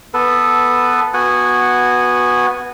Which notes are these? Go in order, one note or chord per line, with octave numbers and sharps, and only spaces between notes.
B3 A4 B4
B3 F#4 F#5 G#5